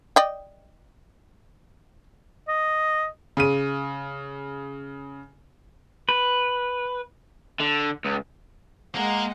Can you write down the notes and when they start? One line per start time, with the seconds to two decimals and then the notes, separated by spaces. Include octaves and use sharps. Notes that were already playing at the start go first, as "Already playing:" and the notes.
0.16 D5 D#5 G5
2.48 D#5
3.37 C#3 D#7
6.09 B4
7.60 D3
8.05 C#2
8.95 G#3 A#3 A#4 F#5